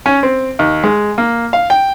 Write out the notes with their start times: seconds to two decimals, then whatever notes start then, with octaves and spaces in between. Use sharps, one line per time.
0.06 C#4
0.23 C4
0.59 D#2
0.84 G#3
1.18 A#3
1.53 F5
1.70 G5